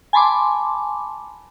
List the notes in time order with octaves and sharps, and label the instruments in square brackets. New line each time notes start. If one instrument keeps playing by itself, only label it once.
[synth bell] G#5 A5 B5 C6 D6